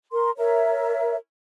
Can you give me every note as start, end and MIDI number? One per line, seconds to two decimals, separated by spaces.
0.12 0.30 70
0.12 0.30 84
0.37 1.16 70
0.37 1.16 73
0.37 1.16 76